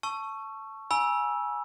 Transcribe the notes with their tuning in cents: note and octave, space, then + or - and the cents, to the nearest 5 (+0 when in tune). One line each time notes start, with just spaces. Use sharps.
A5 +0 C#6 +0 E6 +30
G#5 +0 B5 -40 E6 +0